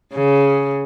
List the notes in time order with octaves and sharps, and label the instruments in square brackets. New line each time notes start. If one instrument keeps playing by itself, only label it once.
[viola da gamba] C#3